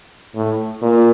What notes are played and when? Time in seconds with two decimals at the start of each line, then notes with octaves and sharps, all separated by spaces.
0.35 A2
0.82 A#2